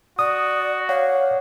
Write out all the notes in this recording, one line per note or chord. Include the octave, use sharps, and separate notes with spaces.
F#4 D5 D#6
C#5 D5 F5 F#5